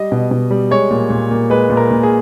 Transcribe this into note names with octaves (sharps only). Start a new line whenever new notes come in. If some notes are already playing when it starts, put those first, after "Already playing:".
Already playing: G3 D#5
B2
B2
G3
G#3 C#5
A#2
A#2
A#2
G#3 B4
A#2
A#4
A#2
G#4